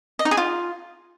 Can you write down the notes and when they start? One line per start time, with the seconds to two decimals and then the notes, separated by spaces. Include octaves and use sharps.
0.19 D#5
0.25 D#4
0.31 G#4
0.37 F4